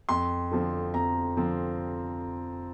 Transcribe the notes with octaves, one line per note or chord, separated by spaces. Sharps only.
F2 C6
D3 F3 C4
F2 A#5
D3 F3 C4